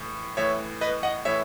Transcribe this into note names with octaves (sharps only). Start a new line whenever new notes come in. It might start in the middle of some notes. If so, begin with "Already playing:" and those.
Already playing: A2 E3
A2 E3 C#5 E5
B4 D#5
D#5 F#5
A2 E3 C#5 E5